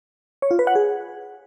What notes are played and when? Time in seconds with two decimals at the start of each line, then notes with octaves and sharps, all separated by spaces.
0.42 C#5
0.51 F4
0.59 B4
0.67 F#5
0.75 G#4